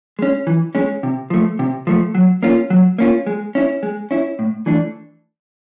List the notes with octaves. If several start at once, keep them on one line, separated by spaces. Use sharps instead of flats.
G#3 C#4
E3
G#3 C#4
C3
F3 A3
C3
F3 A3
F#3
A#3 C#4 F4
F#3
A#3 C#4 F4
G#3
C#4 E4
G#3
C#4 E4
A2
E3 A3 D4